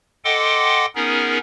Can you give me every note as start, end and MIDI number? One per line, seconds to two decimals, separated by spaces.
0.25 0.86 69
0.25 0.86 75
0.25 0.86 78
0.25 0.86 79
0.25 0.86 84
0.25 0.86 86
0.95 1.38 59
0.95 1.38 61
0.95 1.38 63
0.95 1.38 68
0.95 1.38 70